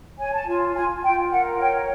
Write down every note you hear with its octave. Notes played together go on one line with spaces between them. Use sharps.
C#5 G#5
A5
F4 G#5
F4 G#5
F4 G5
A#4 F#5
C#5 G5